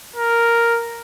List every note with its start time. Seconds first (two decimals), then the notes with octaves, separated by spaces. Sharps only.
0.16 A#4